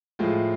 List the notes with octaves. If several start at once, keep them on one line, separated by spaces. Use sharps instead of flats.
A2 F3 G#3 F4